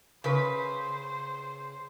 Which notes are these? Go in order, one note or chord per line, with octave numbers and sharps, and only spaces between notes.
C#3 B4 C5